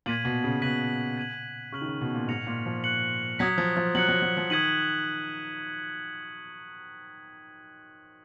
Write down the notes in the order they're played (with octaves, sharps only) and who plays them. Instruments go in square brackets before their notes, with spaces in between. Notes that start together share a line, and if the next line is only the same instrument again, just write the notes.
[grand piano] A#2 [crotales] G#6 B6 D#7 F#7
[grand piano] B2
C#3
[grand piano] B2 [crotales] F#6 B6 D#7 F#7
[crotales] G#6 D#7 F#7
[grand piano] C#3 [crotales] C#6 F6 B6 F#7
[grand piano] D#3
C#3
B2
A#2
[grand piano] G#2 [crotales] F6 A#6 C#7 F7
[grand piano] A#2
F3
[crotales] F#6 C#7 F#7
[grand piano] F#3 [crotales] D#6 G#6 B6
[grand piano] F3
F3
[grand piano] F#3 [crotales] F#6 C#7 F#7
[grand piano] F#3
F#3
F3
[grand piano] D#3 [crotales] D#6 G#6 B6 D#7 F#7